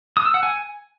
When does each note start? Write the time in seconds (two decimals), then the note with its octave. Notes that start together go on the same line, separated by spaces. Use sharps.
0.17 D#6
0.25 E6
0.34 F#5
0.43 G#5